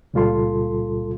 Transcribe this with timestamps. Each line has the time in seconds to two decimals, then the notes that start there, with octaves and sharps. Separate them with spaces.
0.14 C#2 A#2 G3 F4 A4 C6